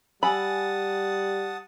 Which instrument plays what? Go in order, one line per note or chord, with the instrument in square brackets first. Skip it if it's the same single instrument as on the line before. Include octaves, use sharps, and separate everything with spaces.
[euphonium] G3 [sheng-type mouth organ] F#5 A5 D#6 [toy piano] G#5 E6 [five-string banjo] B5